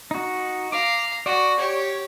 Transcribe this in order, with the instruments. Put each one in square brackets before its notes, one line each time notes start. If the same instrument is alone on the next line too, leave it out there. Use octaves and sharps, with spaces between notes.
[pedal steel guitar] D#4 F#4
[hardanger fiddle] F5 A#5 [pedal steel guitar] D6
[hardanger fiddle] F#4 [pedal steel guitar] D5
[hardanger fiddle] G4 C#5